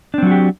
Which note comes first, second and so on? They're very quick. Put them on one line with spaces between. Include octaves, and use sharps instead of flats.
D4 C4 F#3 F#4 G4